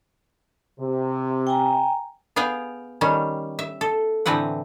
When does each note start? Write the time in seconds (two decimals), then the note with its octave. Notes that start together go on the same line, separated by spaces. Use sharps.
0.80 C3
1.47 G5 G#5 A#5
2.36 B3 G#4 F5 G5
3.01 D#3 G3 C#4
3.59 E5
3.81 A4
4.26 A2 D3 E3 C4 B4 F#5